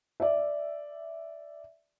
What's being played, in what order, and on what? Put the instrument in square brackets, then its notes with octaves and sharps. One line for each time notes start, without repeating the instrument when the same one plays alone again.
[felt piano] D5 E5